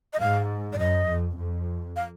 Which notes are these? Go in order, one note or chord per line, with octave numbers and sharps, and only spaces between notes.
D#5
G#2 F5
D5
F#2 D#5
F2
F2
F5